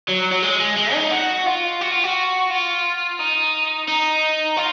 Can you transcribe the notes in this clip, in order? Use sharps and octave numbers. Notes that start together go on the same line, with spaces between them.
F#3
F#3
G#3
G#3
G#3
D#4
F#4
F4
F#4
F4
F#4
F4
D#4
D#4
F4